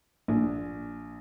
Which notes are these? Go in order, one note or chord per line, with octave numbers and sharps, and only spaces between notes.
A#1